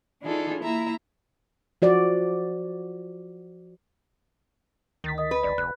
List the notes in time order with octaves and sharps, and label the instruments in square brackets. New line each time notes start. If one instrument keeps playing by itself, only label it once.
[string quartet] E3 D4 D#4 F4 G#4 A4
A#3 E4 E5 A#5
[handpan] F3 F#4 D5
[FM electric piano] D2 A6 B6 [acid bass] D#3
[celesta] D#5 D#6
[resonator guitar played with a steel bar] B4
[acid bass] G#1 [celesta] D5
[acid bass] F1 [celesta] F#6